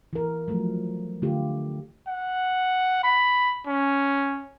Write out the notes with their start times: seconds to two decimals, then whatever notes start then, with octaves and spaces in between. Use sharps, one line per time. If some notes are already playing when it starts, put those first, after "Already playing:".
0.13 E3 A#4
0.48 F3 F#3 A3
1.22 D3 A3 F4 G4
2.08 F#5
3.04 B5
3.66 C#4